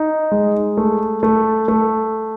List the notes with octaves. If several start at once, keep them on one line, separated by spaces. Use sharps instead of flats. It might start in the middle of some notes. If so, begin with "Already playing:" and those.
Already playing: D#4
G#3
A3
A3
A3